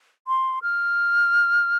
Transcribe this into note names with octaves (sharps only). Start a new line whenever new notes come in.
C6
F6